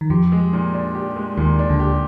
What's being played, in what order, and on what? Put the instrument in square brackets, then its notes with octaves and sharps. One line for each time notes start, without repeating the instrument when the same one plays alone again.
[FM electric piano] D#3
[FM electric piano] F2 F3 [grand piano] G4
[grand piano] G#3
A#2
D4
G4
G#3
[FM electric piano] D#2 D#3 [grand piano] A#2
[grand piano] D4
[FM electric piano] D2 D3
[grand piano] G4